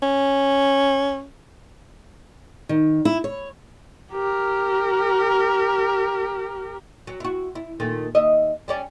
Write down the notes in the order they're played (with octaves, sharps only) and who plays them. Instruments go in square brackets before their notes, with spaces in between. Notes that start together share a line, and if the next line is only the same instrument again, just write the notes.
[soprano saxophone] C#4
[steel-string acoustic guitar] D#3
E4
C#5
[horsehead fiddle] G4 A#4
[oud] F#3
E4 F#4
E4
A#2 D#3 A3
D#2 D#5 E5
G3 C#4 D5